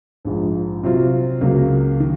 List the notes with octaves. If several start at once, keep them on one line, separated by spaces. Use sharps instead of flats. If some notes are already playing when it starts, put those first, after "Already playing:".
A#1 G#2 F3
C3 F#3 C4 F4
C#2 C#3 F#3 A#3
D#3